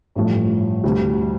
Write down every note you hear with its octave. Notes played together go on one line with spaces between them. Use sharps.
A1 G2 F3 A3
D2 C3 G3